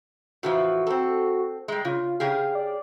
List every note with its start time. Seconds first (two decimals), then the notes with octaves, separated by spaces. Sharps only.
0.43 A2 E3 F3 F#4
0.87 C4 A4
1.68 G3 G#3
1.85 C#3 F4
2.20 C#3 G4 G#4 F5
2.55 D5